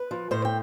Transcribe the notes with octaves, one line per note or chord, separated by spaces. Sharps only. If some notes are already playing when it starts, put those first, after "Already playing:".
Already playing: B4
F3
A2 C5
G5